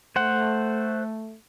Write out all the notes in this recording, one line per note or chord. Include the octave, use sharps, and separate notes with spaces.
A3 C5 F#5